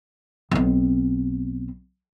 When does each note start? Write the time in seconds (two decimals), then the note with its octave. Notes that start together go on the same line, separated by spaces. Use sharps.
0.51 B1 C4